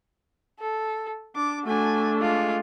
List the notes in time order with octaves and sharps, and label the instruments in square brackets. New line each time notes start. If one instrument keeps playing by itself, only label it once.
[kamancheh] A4
[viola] D4 [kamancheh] D6
[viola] A3 D4 [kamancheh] F#4 G#5
[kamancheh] G#3 F4